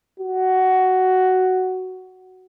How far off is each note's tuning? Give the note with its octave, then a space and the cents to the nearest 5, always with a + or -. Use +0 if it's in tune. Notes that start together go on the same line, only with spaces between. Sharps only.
F#4 +10